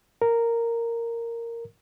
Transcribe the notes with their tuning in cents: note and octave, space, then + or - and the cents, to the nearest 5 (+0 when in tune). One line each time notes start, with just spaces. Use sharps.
A#4 -10